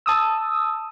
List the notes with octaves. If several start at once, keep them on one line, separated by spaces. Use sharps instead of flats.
A5 D#6 E6